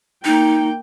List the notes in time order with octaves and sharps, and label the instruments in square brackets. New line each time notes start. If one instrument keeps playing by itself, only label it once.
[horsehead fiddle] A#3 G5 [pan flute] D#4